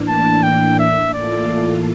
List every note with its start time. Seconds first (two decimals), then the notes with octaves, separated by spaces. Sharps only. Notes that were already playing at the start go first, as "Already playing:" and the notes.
Already playing: A2 E3 A#3 D4
0.08 A5
0.43 G5
0.79 E5
1.14 A2 E3 A#3 F4 A4 D5